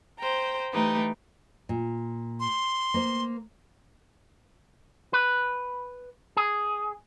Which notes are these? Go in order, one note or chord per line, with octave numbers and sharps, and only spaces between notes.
C5 G5 A#5
E3 A3 D#4 G4 B4
A#2
C6
A#3 C5
B4
G#4